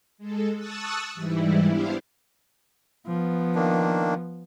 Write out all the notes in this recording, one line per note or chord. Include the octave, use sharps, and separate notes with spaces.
G#3 A4
A5 C#6 D#6 E6 F#6 A6
G#2 E3 G3 E4
B3 D4 E4 G4 C5 F5
F3 B3
D#3 A#3 D4